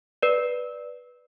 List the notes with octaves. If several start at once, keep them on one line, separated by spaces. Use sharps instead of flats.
B4 D5